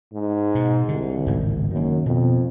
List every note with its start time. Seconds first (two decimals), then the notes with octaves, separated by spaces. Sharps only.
0.14 G#2
0.55 B2
0.88 C2 D3
1.26 G#1 C#2 A2
1.71 F#2 D#3 A#3
2.06 F2 B2